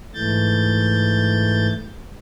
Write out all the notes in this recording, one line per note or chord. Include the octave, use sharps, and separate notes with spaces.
G#2 E3 A3 G6 A6